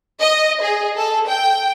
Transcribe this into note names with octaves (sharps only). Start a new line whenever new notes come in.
D#5
G#4
A4
G5